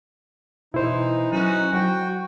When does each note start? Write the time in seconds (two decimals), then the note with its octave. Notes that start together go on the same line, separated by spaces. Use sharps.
0.74 B2 E3 D#4 E4 C5
1.32 F#3 C#4 D#4 F#4
1.73 F#3 F#4 G5